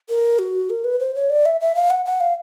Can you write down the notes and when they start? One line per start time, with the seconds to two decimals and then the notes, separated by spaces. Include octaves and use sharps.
0.09 A#4
0.39 F#4
0.70 A#4
0.84 B4
1.00 C5
1.15 C#5
1.30 D5
1.46 E5
1.61 E5
1.75 F5
1.90 F#5
2.05 F#5
2.21 F5